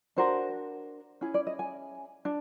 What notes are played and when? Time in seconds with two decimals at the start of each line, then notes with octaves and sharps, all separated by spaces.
0.16 D4 F#4 A#4 C5
1.21 C#4 E4 G#4
1.34 D5
1.47 D#5
1.59 G#5
2.25 D4